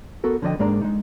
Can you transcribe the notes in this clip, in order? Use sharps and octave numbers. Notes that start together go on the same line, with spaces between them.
B3 F#4 A4 A#4
D3 F3 D4 D#5 G5
G#2 G#3 A#3 D4 D5 A#5
G#3 D#4